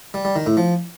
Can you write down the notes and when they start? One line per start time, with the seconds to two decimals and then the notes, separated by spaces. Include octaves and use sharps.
0.14 G3
0.25 G3
0.36 D#3
0.46 A2
0.57 F3